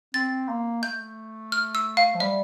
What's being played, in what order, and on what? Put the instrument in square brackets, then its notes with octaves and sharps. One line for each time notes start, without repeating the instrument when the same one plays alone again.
[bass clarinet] C4 [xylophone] A6
[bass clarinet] A#3
[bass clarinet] A3 [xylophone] G6
[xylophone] F6
E6
F5
[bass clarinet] F3
[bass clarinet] G3 [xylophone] E5